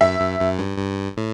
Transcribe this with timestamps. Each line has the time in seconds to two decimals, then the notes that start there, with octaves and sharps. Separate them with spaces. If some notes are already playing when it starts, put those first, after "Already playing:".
0.01 F#2 E5
0.20 F#2
0.40 F#2
0.59 G2
0.78 G2
1.17 A2